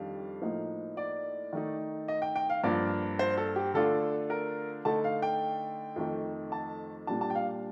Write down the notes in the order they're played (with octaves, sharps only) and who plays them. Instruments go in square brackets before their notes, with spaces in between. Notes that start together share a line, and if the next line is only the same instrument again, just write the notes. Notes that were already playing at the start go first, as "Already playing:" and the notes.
Already playing: [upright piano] F2 D#3 G3 D4 F5
A2 F3 A#3 D#4
D5
D#3 A3 D#4
D#5
G5
G5
F5
G2 F3 A#3 D4 D5
C5
A4
G4
D3 A3 D4 F4 A4
A#4
D3 A3 D#4 A5
F5
G5
F2 D#3 A3 D#4
A5
A#2 G3 D4 A5
A5
G5
F5